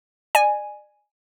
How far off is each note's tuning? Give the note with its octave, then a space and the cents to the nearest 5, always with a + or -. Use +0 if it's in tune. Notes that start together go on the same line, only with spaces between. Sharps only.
D5 +40 G#5 +0